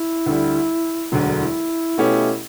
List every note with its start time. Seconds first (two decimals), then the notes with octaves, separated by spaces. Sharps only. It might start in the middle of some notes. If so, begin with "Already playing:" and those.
Already playing: E4
0.26 D2 D3 G3
1.12 E1 D2 D3 F#3
1.33 E4
1.98 B2 A3 C#4 G4